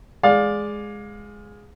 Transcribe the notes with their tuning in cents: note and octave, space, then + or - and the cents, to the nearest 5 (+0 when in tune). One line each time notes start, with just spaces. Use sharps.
G#3 +0 D5 +0 F5 +25